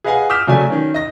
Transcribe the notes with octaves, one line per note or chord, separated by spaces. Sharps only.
G#4 B4 D#5 F5 F#5 G#5
D6 D#6 F6 G6 B6 E7
C#3 F#3 A3 D5 G#5
D#3 C#4
D#5 A#6